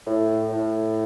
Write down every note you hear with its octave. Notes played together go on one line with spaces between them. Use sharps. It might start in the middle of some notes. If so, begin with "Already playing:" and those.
A2
A2